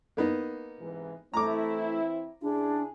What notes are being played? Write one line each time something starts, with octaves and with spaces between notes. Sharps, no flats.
A#3 B3 D#4
G#2 C3 E3
E3 A3 C4 E4 A#5 D6
C#3 D4 E4 G#4